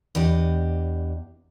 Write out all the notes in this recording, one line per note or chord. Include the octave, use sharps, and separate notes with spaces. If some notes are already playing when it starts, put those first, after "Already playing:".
E2 D4 G4 D#5